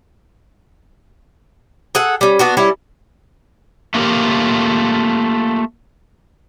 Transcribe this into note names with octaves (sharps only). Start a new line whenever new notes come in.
G#4 A4 F#5
G3 C#4
B3 D4 F#4
G3 C#4 E4
A3 A#3 F4 G4 A#4